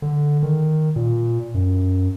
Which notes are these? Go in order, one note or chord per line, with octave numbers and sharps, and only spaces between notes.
D3
D#3
A#2
F#2